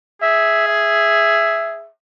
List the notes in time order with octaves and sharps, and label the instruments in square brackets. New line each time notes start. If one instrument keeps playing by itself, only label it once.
[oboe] G#4 [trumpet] E5
[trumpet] E5